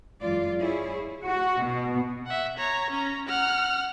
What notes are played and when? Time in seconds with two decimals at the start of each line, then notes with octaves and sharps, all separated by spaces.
0.20 F#2 E3 G#3 F4 D5
0.60 E4 G#4 C#5
1.25 F#4
1.65 B2
2.26 E5 F#5
2.57 C#5 A#5
2.91 C#4 A#5
3.27 F#5 F6